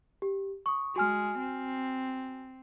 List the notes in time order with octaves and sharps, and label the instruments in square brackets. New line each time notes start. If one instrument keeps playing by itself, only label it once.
[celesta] G4
C#6 D#6
[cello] G#3 [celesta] F#4 G#5 F6
[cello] C4